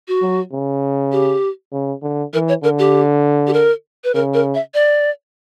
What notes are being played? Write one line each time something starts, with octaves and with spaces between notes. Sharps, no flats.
F#4
F#3
C#3
G4
C#3
D3
E3 A#4
C#5
D3 A#4
G4
G4
A#4
B4
C#3 A#4
A#4
E5
D5